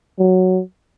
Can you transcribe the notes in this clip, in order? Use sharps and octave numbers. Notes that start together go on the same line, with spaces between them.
F#3